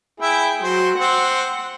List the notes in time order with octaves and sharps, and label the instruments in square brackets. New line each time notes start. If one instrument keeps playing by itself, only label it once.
[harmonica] E4 E5 [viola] G#4 G5
[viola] F#3 [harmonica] C5
[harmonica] C4 [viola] F#5 C6